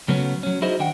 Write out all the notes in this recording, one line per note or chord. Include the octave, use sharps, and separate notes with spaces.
C#3 F#3 A3 B3 C#4
F#3 C#4
D#4 E4 F#4 G#4 C5 D#5
D#3 D4 F#5 G5